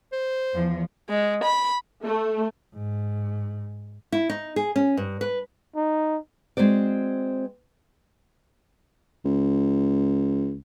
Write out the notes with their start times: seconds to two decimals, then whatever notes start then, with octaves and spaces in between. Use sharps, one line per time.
0.12 C5
0.54 E2 F3
1.08 G#3
1.41 B5
2.04 A3
2.75 G#2
4.12 E4
4.30 D#4
4.56 G#4
4.76 C#4
4.97 G2
5.21 B4
5.76 D#4
6.57 G#3 C4 F#4 C5 D5
9.25 C#2